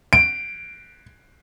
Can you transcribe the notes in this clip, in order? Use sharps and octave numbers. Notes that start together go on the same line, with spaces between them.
D7